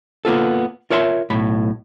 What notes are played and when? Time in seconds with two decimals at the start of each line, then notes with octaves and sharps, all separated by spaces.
0.25 A#3 B3 F4 A4
0.90 F4 A#4 C#5 E5 A5 C6
1.30 B1 A2 B5